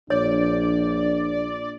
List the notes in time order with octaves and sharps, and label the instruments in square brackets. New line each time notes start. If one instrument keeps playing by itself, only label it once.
[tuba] A#1 [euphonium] D4 [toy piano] C#5 [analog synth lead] D5